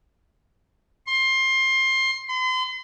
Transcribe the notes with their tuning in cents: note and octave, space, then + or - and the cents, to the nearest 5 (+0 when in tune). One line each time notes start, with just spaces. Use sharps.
C6 +20
C6 -40